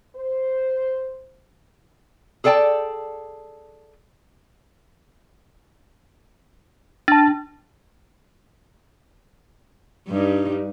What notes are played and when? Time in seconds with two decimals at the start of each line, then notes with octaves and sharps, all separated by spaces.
0.15 C5
2.44 G#4 A4 D5 G5 A5
7.08 D4 A5 A6
10.08 G2 G3 D#4